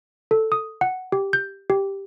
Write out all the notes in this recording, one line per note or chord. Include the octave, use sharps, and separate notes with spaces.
A4
D#6
F#5
G4
G6
G4